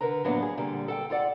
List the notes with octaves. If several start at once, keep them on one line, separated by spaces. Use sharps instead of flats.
D3 A#4 B4 A#5
A2 F3 F#3 A#3 B3 D4
G#4
A#2 D3 G3
A4 F#5 G5
F4 A4 D5 F#5